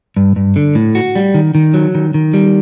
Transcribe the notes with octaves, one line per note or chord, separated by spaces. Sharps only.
G2
G2
D3
A2
F#4
G3
D#3
D#3
F#3
D#3
D#3
G3